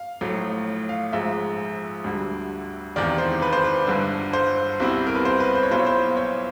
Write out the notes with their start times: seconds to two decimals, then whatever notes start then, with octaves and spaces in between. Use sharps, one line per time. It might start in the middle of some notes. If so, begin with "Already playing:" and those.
Already playing: F5
0.21 A#1 A2 F#3 A3
0.89 F5
1.13 A#1 G#2 F3 G#3 E5
2.04 D2 D3 G3
2.96 E1 E2 C3 D#3 D5
3.18 C5
3.42 B4
3.53 C5
3.64 B4
3.87 G1 G2 D3
4.33 C5
4.80 C2 B2 G3 C4 E4
5.07 A#4
5.15 B4
5.25 C5
5.40 B4
5.55 C5
5.63 C#5
5.71 B1 A#2 F#3 B3 E4 C5
5.79 C#5
5.86 C5
6.17 C#5